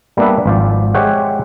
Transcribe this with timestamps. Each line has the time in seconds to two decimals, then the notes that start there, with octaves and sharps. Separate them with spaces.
0.17 G3 A#3 B3 D4 B4 E5
0.46 G#1 F3 F4 C5 D5
0.94 G#3 G4 C5 C#5 E5 F#5